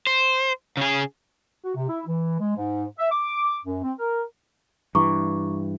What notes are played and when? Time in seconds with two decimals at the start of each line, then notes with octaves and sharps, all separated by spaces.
0.07 C5
0.77 C#3 G#4
1.64 F#4
1.76 C3
1.89 E4
2.06 E3
2.40 G#3
2.57 G#2
2.99 E5
3.12 D6
3.65 F#2
3.84 C4
3.99 A#4
4.95 G2 E3 A#5 C#6 D6